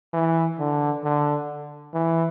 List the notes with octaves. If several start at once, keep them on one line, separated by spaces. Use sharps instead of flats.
E3
D3
D3
E3